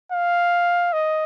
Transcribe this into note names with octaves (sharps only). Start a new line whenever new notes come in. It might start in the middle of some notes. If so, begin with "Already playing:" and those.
F5
D#5